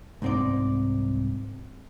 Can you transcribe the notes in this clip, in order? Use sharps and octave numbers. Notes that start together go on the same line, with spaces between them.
C2 G#2 C4 D#4 D5